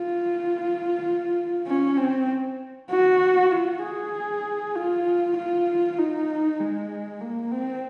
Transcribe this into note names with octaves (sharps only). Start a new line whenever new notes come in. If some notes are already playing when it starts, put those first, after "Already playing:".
Already playing: F4
C#4
C4
F#4
F4
G#4
F4
F4
D#4
G#3
A#3
C4